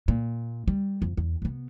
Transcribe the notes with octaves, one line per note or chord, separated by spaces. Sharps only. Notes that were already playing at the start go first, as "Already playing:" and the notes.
A#2
G3
F2
E2
C3 B3